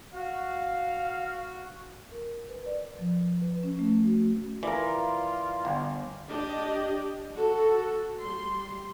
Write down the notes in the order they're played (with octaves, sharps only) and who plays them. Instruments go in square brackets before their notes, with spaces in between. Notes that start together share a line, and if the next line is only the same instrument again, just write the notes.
[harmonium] F#4 [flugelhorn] F5
[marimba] A#4
B4
D5
F3
B4
C#4
A3
F#4
[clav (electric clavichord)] E3 [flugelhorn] F4 [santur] A#4 D5
[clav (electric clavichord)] G1
[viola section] D4 G4 D5 D#5
F#4 A4
G3 C6